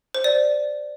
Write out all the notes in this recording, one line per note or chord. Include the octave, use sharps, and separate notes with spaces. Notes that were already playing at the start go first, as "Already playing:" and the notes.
C5
D5